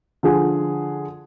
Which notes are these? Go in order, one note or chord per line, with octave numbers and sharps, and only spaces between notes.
D3 F3 G#4